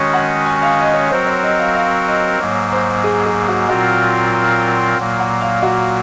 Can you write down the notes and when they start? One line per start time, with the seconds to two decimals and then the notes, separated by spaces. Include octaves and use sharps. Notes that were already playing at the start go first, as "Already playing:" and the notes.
Already playing: D#3 G#3 C#4 F#4 C#5
0.13 F#5
0.46 G#5
0.62 F5
0.79 D#5
0.94 C#5
1.11 F#3 C4 F#4 A#4 C5
1.26 C#5
1.43 D#5
1.59 F5
1.75 F5
2.08 D#5
2.40 G#2 F#3 A#3 C#5
2.72 C5
3.04 G#4
3.26 G#4
3.48 F#4
3.69 A#2 F#3 C4 F4 F#4 A#4
4.98 A#2 F#3 A#3
5.19 F#5
5.41 F5
5.62 F#4